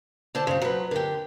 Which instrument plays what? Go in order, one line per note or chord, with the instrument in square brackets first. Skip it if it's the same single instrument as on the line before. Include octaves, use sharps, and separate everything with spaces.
[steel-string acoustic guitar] D3 C5 A5
[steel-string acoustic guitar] C#3 G3 [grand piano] C5
[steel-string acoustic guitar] F#3 B4
[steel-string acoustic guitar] D3 G4 [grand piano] A#4